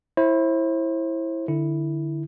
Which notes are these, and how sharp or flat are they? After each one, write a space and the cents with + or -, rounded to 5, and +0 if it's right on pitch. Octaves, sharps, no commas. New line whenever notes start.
E4 +0 C5 +35
D3 +15 E4 -5